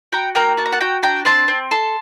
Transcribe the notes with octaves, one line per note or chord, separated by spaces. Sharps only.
F#4 G5 A#5
A#3 G5 A#5
F#4 A5
A#5
F#5 A5
F#4 G5 A#5
D4 G5 A#5
C4 A5 C6
C4
A4 A5 C6